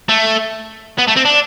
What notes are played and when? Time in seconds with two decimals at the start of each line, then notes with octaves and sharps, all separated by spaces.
0.09 A3
0.98 B3
1.08 A3
1.17 C4
1.25 D4